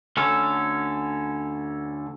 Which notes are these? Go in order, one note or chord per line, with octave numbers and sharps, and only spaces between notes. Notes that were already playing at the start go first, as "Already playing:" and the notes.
D2 D3 C#4 A4